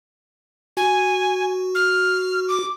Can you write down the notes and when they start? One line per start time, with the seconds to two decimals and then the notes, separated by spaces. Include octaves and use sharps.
0.77 F#4 G#5
1.75 F6
2.48 D6